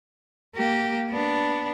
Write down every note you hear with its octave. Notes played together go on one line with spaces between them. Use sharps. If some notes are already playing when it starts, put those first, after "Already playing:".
A#3 G4
B3 D4